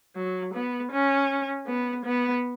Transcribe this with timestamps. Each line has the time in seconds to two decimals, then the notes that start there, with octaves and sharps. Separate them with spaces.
0.16 F#3
0.54 B3
0.92 C#4
1.67 B3
2.05 B3